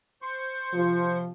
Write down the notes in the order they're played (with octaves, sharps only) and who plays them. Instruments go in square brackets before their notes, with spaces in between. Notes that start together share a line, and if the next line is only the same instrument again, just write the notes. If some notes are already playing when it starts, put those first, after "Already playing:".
[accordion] C5 C6 C#6
[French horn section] C3 F3